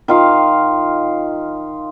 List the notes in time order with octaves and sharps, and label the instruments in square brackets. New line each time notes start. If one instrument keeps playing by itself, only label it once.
[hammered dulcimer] D#3 F4 F5